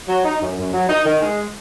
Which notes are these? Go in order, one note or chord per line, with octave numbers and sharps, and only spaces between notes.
F#3
D#4
F#2
F#2
F#3
D#4
D#3
G#3